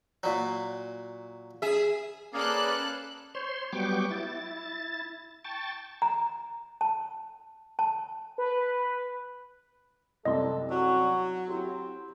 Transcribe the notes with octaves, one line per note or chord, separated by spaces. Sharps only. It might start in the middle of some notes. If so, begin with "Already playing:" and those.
A#2 F#3
G#4 E5
A#3 C#4 G#4 A4 B4 D5 F5 F#6
C5 C#5 C6
F#3 G3 B3 G5 C#6 D6
E4 A6
G5 A5 C#6 A6
A#5
A5
A5
B4
C2 F#2 A4 D5 D#5 C6
F#3 F#4
C4 E4 G4